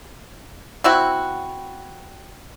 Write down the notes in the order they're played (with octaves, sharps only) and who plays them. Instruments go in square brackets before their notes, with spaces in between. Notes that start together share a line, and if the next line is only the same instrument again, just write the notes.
[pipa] C4 E4 F#4